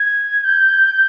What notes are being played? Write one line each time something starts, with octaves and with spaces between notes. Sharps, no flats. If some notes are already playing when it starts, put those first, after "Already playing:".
Already playing: G#6
G6